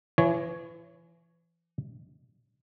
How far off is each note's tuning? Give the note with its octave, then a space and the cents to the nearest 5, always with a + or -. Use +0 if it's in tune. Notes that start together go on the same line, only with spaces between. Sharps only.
E3 +35 C#5 +5